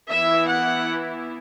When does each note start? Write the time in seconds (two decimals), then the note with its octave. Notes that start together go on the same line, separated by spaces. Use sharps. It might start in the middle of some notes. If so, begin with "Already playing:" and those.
0.11 E3 B3 E4 E5
0.49 F#5